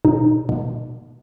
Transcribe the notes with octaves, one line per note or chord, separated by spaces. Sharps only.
B2 D#4
B2